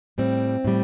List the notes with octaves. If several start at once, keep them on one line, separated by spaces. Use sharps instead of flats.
A2 G3 C4
A2 G3